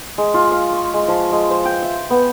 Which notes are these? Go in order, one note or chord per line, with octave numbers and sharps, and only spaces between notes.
G#3
F4
F5
C#6
G#3
F3
G#3
C5
G5
E5
B3